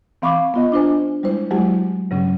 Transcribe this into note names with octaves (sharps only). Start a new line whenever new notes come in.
E3 C4 F5 B5 C#6 D6
B3 F4 D#5
D4 F4 C5 G#5
G3 G#3 E4 C5
F#3 G#3 A3 E4 F#4 G4
G2 C#3 F#3 C#4